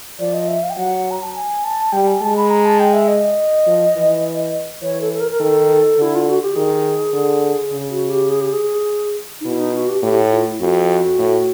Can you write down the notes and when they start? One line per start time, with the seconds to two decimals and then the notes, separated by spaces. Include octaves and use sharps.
0.19 F3 D5
0.34 D#5
0.48 E5
0.63 F5
0.70 G5
0.77 F#3 F#5
1.11 A#5
1.22 A5
1.35 G#5
1.64 A5
1.92 G3 G5
2.07 G#5
2.21 G#3 A5
2.37 B5
2.50 A#5
2.65 A5
2.80 G5
2.94 E5
3.08 D#5
3.66 F3
3.95 E3
4.82 E3 C#5
5.01 A4
5.13 A4
5.20 A#4
5.31 A#4
5.40 D#3 A4
5.98 D3 E4
6.15 F4
6.29 F#4
6.42 G4
6.55 D#3 G#4
7.13 D3
7.71 C#3
7.90 F#4
8.10 G4
8.29 G#4
8.41 G4
8.53 G#4
9.41 D#4
9.45 B2 E4
9.59 D#4
9.74 F#4
9.89 G4
10.02 A2 G4
10.32 F4
10.46 E4
10.60 F2 F#4
11.18 A2